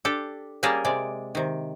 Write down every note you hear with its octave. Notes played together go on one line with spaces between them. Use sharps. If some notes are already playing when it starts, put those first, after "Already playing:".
D4 G4 A4
G3 A#3 C#4 G#4 A#4 A5
C3 G#3 D5
C3 D#3